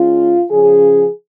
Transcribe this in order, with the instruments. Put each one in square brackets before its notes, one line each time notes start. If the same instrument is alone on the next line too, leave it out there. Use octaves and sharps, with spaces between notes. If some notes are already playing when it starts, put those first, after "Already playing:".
Already playing: [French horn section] C#3 G#3 C#4 F4
C#3 F3 C#4 G#4